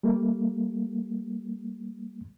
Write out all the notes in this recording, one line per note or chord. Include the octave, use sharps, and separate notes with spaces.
G3 A3 A#3